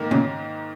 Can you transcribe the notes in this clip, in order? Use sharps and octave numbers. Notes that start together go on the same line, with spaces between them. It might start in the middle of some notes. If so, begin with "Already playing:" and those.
Already playing: G#2 D#3 A#3
A#2 C#3